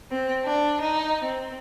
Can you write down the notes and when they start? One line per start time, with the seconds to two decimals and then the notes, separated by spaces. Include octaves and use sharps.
0.11 C4
0.44 D4
0.80 D#4
1.23 C4